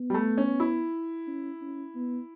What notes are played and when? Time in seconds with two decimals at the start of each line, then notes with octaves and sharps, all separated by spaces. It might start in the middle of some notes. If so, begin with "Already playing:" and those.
Already playing: B3
0.10 G3
0.14 A3
0.38 C#4
0.60 E4
1.27 C#4
1.62 C#4
1.95 B3